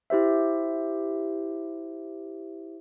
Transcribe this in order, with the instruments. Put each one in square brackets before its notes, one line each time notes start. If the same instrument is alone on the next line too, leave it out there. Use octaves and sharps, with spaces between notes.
[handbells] E4 G4 C5 E5